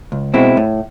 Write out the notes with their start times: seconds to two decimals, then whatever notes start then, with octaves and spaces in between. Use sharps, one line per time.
0.12 C#2
0.34 B2 G#3 C4 E4
0.57 A2